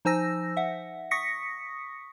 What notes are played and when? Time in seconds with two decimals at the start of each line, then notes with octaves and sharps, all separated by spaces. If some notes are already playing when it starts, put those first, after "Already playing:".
0.05 F3 D#4 C5 G#5 E6 A#6
0.57 E5 F#5
1.11 C#6 D#6 A#6 B6 C#7